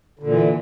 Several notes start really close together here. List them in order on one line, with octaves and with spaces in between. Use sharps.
D3 A#2 E3